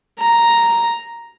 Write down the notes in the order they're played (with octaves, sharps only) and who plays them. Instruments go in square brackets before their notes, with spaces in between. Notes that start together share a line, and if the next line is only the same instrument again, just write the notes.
[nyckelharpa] A#5